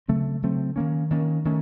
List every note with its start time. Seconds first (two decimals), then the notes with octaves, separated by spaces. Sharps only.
0.08 C#3 F#3 A3 C4
0.42 C#3 F#3 A3 C4
0.76 D#3 A#3 C#4
1.11 D#3 A#3 C#4
1.45 D#3 A3 C#4